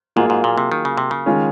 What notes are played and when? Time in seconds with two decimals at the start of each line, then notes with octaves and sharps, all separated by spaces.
0.16 G#2 F#3 A#3 F4 G#4
0.30 G#2
0.44 A#2
0.58 C3
0.72 D#3
0.85 C#3
0.98 C3
1.11 C#3
1.26 D#3 G#3 C#4 F4 G#4